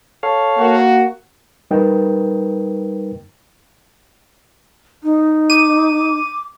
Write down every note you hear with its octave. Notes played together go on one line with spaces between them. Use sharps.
A4 C#5 F5
A#3 F#4
G3 D#4 A#4 B4 G5
D#4
D6 D#7